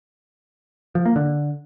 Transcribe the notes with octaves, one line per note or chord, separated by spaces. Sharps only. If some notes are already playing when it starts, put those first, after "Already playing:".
F3
A#3
D3